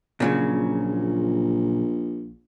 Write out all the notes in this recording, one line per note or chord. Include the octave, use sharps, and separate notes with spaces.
A#1 A#2 C#3 F#3